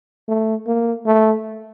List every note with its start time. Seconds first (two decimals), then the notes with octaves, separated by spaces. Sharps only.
0.28 A3
0.67 A#3
1.06 A3